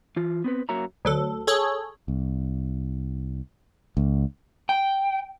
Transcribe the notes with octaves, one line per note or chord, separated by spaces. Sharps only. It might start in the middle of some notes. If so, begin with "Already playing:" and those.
E3 F4
B3 C4 B4
F#2 A#3 F#4 C#5 E5 A#5
D2 F#3 A4
G#4 A4 C#5
C2
C#2
G5